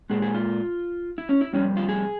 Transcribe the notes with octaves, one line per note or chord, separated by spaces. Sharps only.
A#2 G#3 G#4
G#4
F4
E4
C#4
E4
F2 C3 G3 C#4
F4
G#4